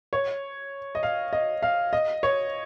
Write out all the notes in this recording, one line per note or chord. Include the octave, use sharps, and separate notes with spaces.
C#5
D#5
F5
D#5
F5
D#5
C#5